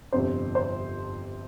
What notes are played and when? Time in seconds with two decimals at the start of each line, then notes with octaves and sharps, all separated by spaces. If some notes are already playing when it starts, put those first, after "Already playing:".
0.12 G1 F2 C3 C5
0.55 C5